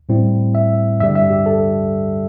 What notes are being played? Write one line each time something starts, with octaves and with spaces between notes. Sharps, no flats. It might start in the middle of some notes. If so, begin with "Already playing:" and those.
A2 G3 C4 E4
E5
G2 D3 G3 E5
E5
G4
A4